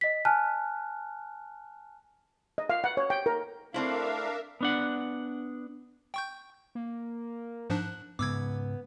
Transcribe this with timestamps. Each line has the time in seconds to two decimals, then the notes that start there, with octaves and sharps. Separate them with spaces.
0.01 D#5 B6
0.25 G#5 A5 F6 F#6
2.58 D#5
2.70 F5
2.84 F#5
2.97 C#5
3.10 G5
3.26 A#4
3.74 A3 C4 D4 E4 A#4 E5 F5
4.61 B3 D4 F#5
6.14 G5 C#6 G6
6.75 A#3
7.70 G#2 F3 D4 F#6
8.19 G#2 C#3 B3 D6 E6 G#6